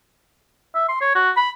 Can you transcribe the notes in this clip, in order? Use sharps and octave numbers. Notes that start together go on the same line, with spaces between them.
E5
C6
C#5
F#4
B5